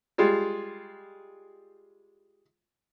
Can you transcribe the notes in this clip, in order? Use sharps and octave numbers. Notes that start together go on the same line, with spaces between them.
G3 G#3 F4